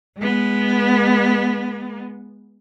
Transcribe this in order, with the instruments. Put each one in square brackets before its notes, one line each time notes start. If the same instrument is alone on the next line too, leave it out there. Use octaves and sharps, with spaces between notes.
[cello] G#3 B3